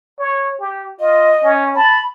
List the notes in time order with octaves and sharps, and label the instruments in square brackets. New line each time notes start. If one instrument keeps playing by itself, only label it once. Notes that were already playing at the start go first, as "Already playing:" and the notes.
[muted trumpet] C#5
G4
[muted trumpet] F4 [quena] D#5
[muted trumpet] C#4
[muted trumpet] A5 [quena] B5